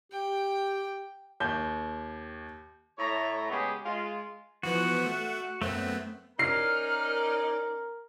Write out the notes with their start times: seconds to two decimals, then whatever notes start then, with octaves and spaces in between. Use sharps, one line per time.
0.12 G4 G5
1.40 D#2 G6
2.97 A2 A3 C#5 A#5
3.49 C#3 G#3 B3 G4 G#4
3.85 G#3 F4
4.63 E3 F3 B3 F#4
5.06 A3
5.62 F#2 A3 B3 C4
6.39 C#4 D#4 A#4 D5 F6 C7